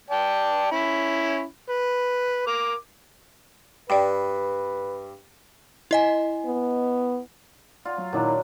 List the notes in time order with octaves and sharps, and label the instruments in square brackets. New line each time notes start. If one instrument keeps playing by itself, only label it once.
[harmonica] D5 G5 A5
C#4 E4 B5
B4
A#4 D6
[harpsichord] G2 [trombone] B4 [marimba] D5 G5
[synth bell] E4 D#5 G#5
[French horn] B3
[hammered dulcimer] F4 [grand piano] D5 F#5
[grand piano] F#3
[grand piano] A#2 D#3 E4 [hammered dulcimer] F#3 D4